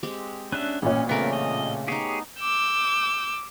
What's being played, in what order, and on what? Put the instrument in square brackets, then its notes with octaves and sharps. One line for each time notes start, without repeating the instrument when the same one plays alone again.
[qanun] G#3 C4 G4
[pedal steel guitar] C#4 D4 E5 [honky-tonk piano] F#6
[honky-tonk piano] A1 A#2 C#5 [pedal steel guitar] C#4
[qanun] C#3 A3 C4 [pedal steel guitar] B3 A#4
[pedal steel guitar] D#5
[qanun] B3 D#4 [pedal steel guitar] G4 G#4 C#5
[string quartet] D6 E6 G6